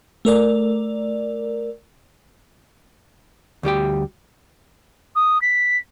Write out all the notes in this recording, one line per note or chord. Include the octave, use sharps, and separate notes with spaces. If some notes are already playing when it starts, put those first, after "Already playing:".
A3 A#4 D5
D2 G3 G4 G5
D#6
B6